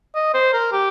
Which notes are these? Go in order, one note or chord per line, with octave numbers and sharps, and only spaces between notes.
D#5
C5
A#4
G4